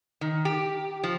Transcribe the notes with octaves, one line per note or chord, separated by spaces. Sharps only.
D#3
G4
F3